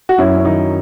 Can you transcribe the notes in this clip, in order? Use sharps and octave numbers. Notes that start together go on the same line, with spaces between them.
F#4
F#2 C#4 E4
C#4
D#3 F#3 D#4